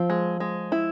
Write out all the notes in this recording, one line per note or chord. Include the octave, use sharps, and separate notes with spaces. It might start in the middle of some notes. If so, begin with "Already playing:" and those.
Already playing: F3 C4
G#3
G#3
E4